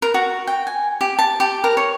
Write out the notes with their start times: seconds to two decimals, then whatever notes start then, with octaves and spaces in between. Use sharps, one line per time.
0.02 A#4
0.14 F#4
0.47 G5
0.67 G#5
1.01 G4
1.19 A5
1.40 G4
1.64 A#4
1.77 C#5